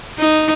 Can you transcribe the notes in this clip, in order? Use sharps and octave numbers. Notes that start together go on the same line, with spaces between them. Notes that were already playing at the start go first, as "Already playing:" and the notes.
D#4